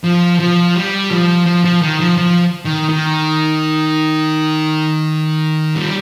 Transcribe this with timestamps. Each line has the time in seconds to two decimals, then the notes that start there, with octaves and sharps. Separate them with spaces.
0.04 F3
0.40 F3
0.75 G3
1.11 F3
1.46 F3
1.64 F3
1.82 D#3
2.00 F3
2.18 F3
2.65 D#3
2.89 D#3
5.76 G3